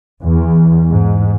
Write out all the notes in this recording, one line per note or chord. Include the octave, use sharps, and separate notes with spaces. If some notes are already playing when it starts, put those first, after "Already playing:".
E2
G#2